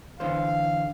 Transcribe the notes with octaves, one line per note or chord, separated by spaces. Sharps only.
D3 E3 C5 F5